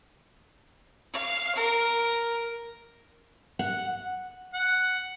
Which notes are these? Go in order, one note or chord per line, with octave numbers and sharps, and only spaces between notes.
F5
A#4
F#5
F#5